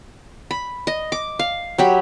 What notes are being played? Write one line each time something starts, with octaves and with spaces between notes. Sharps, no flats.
B5
D#5
D6
F5
F#3 G4 B5